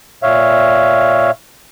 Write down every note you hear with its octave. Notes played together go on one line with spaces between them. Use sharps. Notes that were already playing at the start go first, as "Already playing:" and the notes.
A#2 C#5 E5 F5